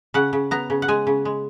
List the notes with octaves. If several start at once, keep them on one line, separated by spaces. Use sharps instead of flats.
C#3 F#5
C#3
B3 A#5
C#3
F#5
G#3 G#5
C#3
G#3